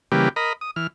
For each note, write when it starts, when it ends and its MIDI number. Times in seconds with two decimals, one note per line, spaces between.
0.12 0.29 49
0.12 0.29 52
0.12 0.29 55
0.12 0.29 58
0.12 0.29 67
0.12 0.29 71
0.36 0.53 70
0.36 0.53 75
0.36 0.53 83
0.61 0.71 87
0.76 0.87 52
0.76 0.87 89